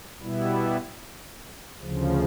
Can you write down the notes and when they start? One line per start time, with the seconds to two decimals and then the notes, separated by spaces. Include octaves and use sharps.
0.21 B2 G3 B3 E4
1.81 D2 C#3 F3